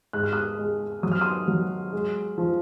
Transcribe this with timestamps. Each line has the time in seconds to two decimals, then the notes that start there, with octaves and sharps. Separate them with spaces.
0.13 G#2 F#6
0.24 F6
0.32 D#6 F#6
0.58 G#3
1.03 F#3 D#6
1.12 F6
1.21 C6 D#6
1.48 F#3
1.93 G#3
2.38 F3